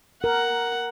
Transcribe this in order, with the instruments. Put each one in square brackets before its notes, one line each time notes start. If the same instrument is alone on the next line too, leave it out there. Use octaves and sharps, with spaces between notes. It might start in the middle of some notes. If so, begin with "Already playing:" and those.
[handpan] A#4 [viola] F#5